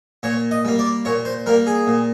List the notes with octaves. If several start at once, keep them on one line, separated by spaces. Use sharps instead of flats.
A#2 C#5
D#5
G3 A#3
D5
A#2 C#5
C5
G3 A#3 A#4
G#4
A#2